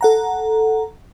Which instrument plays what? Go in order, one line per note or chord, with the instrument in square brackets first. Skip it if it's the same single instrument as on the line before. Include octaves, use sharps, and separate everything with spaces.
[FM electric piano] A4 F#5 A#5